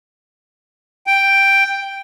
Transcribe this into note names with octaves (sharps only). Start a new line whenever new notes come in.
G5